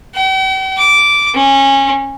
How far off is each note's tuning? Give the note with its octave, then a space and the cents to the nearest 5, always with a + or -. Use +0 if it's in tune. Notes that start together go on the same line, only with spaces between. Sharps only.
G5 -45
D6 -10
C#4 -20